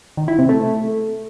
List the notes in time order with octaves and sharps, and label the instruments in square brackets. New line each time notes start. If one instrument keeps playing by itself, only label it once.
[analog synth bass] D#3
E4
C3
A3